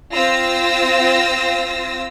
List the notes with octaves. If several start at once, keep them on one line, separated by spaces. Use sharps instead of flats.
C4 F4 E6 A#6